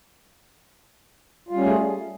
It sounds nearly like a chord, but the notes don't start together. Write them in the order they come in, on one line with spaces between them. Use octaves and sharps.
F4 G3 C#4 A3 G#4